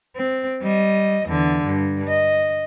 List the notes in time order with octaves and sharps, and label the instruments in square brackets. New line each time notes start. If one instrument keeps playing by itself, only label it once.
[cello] C4
G3 D#5
E2 D3
G2
D#5